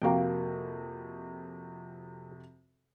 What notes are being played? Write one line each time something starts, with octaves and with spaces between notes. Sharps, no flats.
F2 C3 A#3 F#4 G5